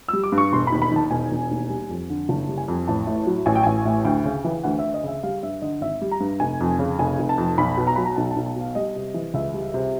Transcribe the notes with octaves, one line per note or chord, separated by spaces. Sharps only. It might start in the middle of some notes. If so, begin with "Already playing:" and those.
G3 E6
D6
G2
C#6
E1 C6
D#2 B5
B5
D#3 A5
E1 G#5
E1
D#2
G3
F2
D3
F#1 A5
G3
G#5
F2
A1 A5
A2
F#3
A1 G#5
G5
A1 G#5
A2
D2 G5
C#3
E3
D2 F#5
D2 E5
D#5
C#3 E5
G3 F5
G2 E5
D3 D#5
G#1 E5
G3
A#5
G2
F1 G#5
F2
C#3
F1 G#5
F1
A5
F2
B1 B5
B2
A#5
F#3 B5
A#5
B1 A5
A5
B1
A5
B2 F5
G3 D#5
C3
E3
C#2 E5
G3
C3